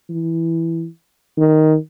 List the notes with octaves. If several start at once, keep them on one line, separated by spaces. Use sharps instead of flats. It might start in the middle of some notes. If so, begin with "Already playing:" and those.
E3
D#3